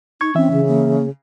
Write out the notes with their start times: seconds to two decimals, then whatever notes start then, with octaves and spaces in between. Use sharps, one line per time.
0.21 D#4 C#6 G#6
0.35 E3 C4 C#4 E5
0.52 C#3
0.68 A#3